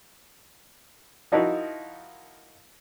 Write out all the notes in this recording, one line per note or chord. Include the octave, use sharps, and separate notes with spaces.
F3 D#4 E4 F#4 A#4